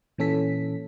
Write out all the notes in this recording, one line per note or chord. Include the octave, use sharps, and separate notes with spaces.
A#2 E3 C#4 A4 B6